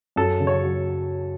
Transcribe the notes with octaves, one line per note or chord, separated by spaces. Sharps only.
F#2 A4
C#3
C#5
F#3